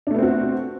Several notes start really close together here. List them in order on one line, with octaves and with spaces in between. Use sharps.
D4 A3 B3 C4 F#4